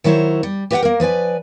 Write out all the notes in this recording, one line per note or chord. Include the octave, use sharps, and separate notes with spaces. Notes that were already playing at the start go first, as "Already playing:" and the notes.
D#3 F#3 E4 C5 C#5
G3
G4 B4 D#5 E5 F#5 G5
A#3 A#4
F3 B4 D5 G#5